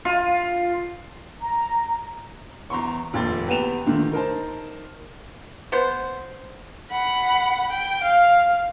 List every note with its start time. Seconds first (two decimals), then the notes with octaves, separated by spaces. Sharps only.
0.05 F4
1.42 A#5
2.70 E2 A#5 C6 C#6
3.13 F1 A#1 D#2 G5 C6 A6
3.48 E2 G4 B4 G5 E7 F7
3.86 A#2 D3 D#3 A3
4.12 D#4 A#4 C5 A5
5.72 B3 C5
6.90 F#5 B5
7.70 G5
8.03 F5